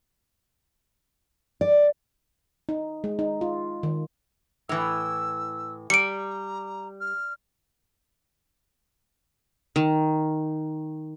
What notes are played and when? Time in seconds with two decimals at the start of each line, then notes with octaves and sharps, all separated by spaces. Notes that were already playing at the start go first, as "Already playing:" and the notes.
1.61 D5
2.69 D#4
3.04 G#3
3.19 D#4
3.41 F4
3.83 D#3
4.69 A2 E3 E6
5.90 G3 A#5 C#7 D7
7.01 F6
9.76 D#3